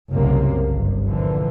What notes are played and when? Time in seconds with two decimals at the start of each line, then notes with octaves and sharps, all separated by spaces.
0.12 F#1 C2 F#2 C3 A#3
0.68 G1
1.06 A#2 D3 E3 F3